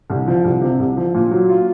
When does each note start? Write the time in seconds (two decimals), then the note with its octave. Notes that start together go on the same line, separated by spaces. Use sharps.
0.10 C2
0.28 F3
0.44 C2
0.62 C3
0.80 C2
0.97 F3
1.15 A#2
1.31 F#3
1.49 F4